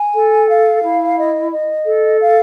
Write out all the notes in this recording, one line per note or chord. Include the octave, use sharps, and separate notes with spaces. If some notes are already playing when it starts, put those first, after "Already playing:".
Already playing: G#5
A4
F5
E4
D#5
D#5
A4
F5